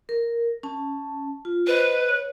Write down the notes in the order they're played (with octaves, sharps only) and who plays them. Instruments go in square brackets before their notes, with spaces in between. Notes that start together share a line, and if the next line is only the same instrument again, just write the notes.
[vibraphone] A#4
C#4 A5
F4
[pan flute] B4 [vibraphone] C5 D#5
[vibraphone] C#5